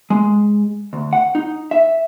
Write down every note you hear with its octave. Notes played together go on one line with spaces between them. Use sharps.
G#3
D2
F#5
D#4
E5